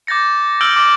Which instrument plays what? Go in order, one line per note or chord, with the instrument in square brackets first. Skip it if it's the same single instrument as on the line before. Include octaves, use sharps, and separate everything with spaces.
[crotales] D6 G6 A6 A#6 C#7
E6 F6 G6 D7 F#7 G7
D6 A#6